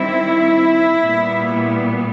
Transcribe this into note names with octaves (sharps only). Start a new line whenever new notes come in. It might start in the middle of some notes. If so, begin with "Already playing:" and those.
Already playing: D#3 G3 C4 E4
A#2 G3 B3